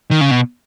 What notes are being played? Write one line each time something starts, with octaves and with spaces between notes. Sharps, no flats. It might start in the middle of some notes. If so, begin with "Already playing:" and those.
D#3
C#3
B2